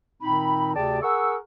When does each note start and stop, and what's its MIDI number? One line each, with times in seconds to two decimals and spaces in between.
0.23 0.75 46
0.23 0.75 51
0.23 0.75 60
0.23 0.75 63
0.23 0.75 83
0.76 1.02 38
0.76 1.02 48
0.76 1.02 68
0.76 1.02 74
0.76 1.02 79
0.76 1.02 81
1.03 1.36 68
1.03 1.36 70
1.03 1.36 78
1.03 1.36 85
1.03 1.36 88